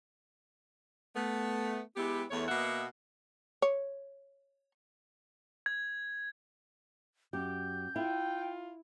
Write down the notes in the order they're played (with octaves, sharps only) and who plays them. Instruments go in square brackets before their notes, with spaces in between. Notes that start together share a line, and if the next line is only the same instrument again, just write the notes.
[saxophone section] A3 B3
G#3 B3 E4 G4
E2 A3 C#5
B2 A#3 B3 D#5 E5 F#5
[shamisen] C#5
[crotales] G#6
[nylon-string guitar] F#2 G4 [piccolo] G6
[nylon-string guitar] E4 [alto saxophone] F4 [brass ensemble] G5